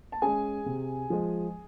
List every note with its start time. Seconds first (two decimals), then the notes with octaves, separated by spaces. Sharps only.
0.12 A5
0.22 G#3 C#4 G#4 G#5
0.66 C3
1.10 F3 G#3